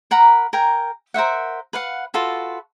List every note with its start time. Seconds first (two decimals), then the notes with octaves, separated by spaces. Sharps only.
0.11 A#4 F#5 A#5 B5
0.53 A#4 G5 G#5 A#5
1.14 A#4 C5 E5 F#5
1.73 B4 F5 F#5
2.14 F4 F#4 A4 B4